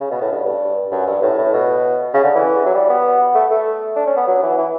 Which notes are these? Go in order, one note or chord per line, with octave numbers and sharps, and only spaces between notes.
C#3
B2
A2
G2
G2
F#2
G2
A2
A2
B2
C#3
D3
E3
F#3
G3
B3
A3
A3
D4
C#4
B3
F#3
E3
E3